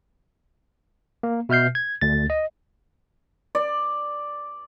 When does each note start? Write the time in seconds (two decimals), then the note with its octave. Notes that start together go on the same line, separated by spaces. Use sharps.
1.23 A#3
1.49 B2 E5 F6 G6 C7
1.75 G#6
2.01 D2 A6
2.30 D#5
3.55 D5